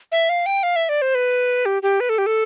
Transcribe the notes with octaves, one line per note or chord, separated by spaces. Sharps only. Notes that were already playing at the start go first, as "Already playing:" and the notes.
E5
F5
G5
F5
E5
D5
C5
B4
G4
G4
B4
A4
G4
A4